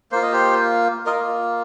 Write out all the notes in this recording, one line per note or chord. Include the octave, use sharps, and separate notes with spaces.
A#3 F4 C5
D#5
G4 C5
A#3 F4 A#4 D#5